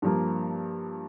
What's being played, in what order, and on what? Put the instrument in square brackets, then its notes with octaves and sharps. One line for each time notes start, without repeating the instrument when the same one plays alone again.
[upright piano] G2 F3 A#3